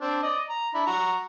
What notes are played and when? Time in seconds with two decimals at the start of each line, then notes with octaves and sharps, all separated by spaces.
0.01 C4 D4
0.23 D5 D#5
0.50 A#5
0.74 D4 E4 B5
0.87 F#4 A#5